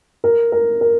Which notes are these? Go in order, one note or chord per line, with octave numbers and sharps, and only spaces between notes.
A#4
A#4
A#4